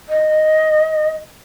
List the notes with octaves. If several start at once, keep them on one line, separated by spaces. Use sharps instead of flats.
D#5